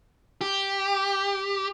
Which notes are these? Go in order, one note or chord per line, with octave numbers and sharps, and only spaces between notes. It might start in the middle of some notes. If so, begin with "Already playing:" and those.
G4